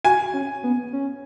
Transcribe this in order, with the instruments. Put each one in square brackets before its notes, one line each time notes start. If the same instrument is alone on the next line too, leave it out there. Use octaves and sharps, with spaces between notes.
[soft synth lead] F#4 [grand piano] G#5
[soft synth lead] C#4
B3
C#4